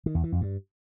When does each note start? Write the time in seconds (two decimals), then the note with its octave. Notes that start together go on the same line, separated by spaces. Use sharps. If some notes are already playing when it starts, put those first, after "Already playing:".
0.06 D#3
0.15 E2
0.24 E3
0.32 F2
0.41 G2